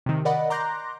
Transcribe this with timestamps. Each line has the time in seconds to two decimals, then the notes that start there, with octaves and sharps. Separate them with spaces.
0.06 C3 D#3
0.25 A#4 D5 D#5 F#5 B5
0.50 A#5 C6 D6 F#6 G6 A#6